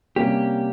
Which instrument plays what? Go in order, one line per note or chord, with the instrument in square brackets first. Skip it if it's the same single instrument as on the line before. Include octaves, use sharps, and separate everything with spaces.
[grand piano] C3 G3 A#3 C#4 [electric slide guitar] G4